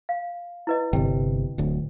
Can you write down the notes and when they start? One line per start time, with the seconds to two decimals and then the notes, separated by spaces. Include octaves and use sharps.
0.09 F5
0.67 E4 B4 D#5
0.93 G1 C3 G5
1.58 D1 D2